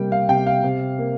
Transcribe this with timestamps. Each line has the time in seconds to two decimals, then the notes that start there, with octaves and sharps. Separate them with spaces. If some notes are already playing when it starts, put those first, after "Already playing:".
Already playing: C3 G3 A#3 G5
0.12 F5
0.29 C3 G5
0.47 F5
0.64 C3
0.98 A#3